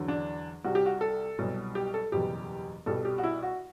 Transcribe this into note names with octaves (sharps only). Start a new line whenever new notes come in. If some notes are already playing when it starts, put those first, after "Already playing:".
Already playing: E2 D3 F#3
D4
C2 C3 G3 F#4
G4
F#4
A4
C2 B2 F#3
G4
A4
F#1 E2 B2 G3 G4
C2 B2 G3 A4
G4
F#4
E4
F#4